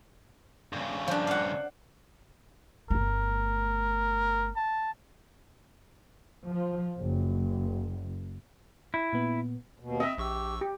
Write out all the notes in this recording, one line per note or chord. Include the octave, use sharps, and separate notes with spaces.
G2 C#3
F3 D4
F5 F#5
G1 A3 A#4
A5
F3
F#1
E4
A#2 B3
D#2 B2
C4 D#5 E5
A#1 G4 C#6 E6
G4